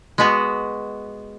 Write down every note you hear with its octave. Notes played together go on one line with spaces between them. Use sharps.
G#3 B3 F#4